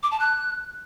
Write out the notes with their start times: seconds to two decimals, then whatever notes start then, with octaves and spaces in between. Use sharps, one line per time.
0.03 D6
0.12 A5
0.20 F#6